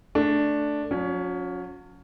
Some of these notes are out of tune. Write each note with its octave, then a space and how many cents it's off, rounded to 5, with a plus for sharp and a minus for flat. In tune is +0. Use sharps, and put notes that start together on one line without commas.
A3 +0 D4 +0
F#3 -40 C#4 +20